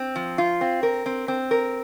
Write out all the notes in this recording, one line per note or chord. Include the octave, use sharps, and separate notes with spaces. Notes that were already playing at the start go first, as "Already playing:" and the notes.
Already playing: C4
F3
F4
C4
A#4
C4
C4
A#4